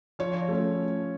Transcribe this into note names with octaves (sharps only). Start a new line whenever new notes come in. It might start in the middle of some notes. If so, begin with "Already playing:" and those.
F3 C#5
A3 C#4